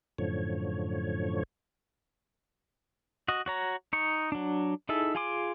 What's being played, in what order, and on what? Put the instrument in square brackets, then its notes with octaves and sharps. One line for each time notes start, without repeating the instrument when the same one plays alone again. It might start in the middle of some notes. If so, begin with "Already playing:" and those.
[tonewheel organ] F#2 A2 D3 F3 C#5
[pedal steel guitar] F#4 D#5
F#4 C#5 A#5
D#4 C#6
F#3 D4
D#4 E4 G#4 A4 E5
F4 G#4 G#5 C6 D6